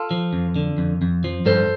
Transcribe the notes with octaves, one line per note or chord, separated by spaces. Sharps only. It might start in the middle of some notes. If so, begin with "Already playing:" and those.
Already playing: F4 A4
F3
F2
D3
F2
F2
F3
G2 A4 C5